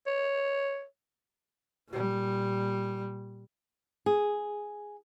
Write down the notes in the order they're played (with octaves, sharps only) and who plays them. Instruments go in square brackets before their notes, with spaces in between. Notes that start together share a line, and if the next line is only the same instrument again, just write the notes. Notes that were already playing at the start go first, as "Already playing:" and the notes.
[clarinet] C#5
[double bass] A#2 G3
[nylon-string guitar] G#4